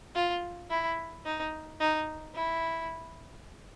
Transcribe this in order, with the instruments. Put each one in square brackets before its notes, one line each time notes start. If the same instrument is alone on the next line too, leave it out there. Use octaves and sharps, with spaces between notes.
[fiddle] F4
E4
D#4
D#4
E4